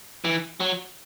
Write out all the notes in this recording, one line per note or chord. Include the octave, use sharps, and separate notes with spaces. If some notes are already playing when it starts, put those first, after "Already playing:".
E3
F#3